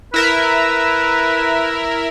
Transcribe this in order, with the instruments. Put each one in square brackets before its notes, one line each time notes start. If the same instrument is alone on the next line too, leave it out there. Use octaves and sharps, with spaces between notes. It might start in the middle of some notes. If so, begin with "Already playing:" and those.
[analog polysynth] E4 A#4 E5 [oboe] B4